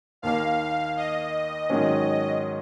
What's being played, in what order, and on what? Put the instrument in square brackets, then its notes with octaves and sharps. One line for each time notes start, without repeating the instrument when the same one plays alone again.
[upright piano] D#2 D#3 A#3 [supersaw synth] F5
[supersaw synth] D#5
[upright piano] G#2 D#3 F#3 C#4